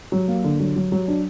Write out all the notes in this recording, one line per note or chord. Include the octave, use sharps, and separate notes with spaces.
F#3
A#3
D3
F#3
F#3
F#3
D4